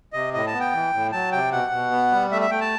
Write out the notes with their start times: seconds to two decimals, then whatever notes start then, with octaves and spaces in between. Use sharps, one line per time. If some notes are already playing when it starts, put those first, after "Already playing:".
0.13 C3 D#5
0.34 A2 D#5
0.47 A5
0.53 B3
0.60 G5
0.73 E3
0.93 A2
1.12 F#3 A5
1.32 C3 G5
1.52 B2 F#5
1.72 B2
1.91 B3
2.11 G3
2.31 A3 E5
2.42 E5
2.51 A3 G5
2.61 A5